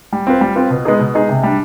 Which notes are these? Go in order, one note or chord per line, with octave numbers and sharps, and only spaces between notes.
G3
C4 F4 B4
G3
C4 F4 B4
B2
G#3 B3 D#4 G#4
B2
G#3 B3 D#4 G#4
C3
G3 D4